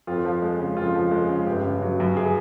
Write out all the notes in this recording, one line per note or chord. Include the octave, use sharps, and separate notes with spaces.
F2 F4
F3
G#3
C#3
F2 F4
F3
G#3
C#3
G1 G4
C#3
F#3
F#2
G#4